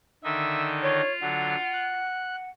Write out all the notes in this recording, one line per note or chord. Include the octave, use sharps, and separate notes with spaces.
D3 D#3 D#4 E5
F4 C#5
D3 F#3 F#5
F#6